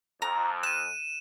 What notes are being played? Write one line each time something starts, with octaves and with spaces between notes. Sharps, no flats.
F2 A#5
F#6 D#7 E7